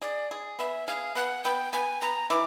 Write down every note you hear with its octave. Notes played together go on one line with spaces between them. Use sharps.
G#4 D5
G#4
B3 E5
G#4 F5
B3 F#5
B3 G5
B3 G#5
B3 A#5
E3 D6